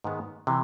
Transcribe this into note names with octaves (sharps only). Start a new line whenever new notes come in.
G#2 D#3 G#3 B3
C3 E3